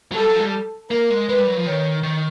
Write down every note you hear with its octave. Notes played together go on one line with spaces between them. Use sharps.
F#3
G3 A4
F#3
F3
G#3
G3
A#3 A#4
G#3
G#3 B4
G3
F#3
F3
D#3 C#5
D#3